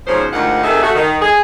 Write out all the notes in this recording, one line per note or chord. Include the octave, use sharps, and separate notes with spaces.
G#2 B2 F3 C#4 G#4 C5
D2 G#2 D#3 F4 F#5
C3 D#3 G#4 A4 E5
A3 F#4
D#3
G#4